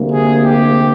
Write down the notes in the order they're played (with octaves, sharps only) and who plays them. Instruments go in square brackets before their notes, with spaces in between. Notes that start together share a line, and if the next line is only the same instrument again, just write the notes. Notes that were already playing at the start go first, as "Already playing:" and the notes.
Already playing: [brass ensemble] D2 C3 G3 A#3
G#4
G4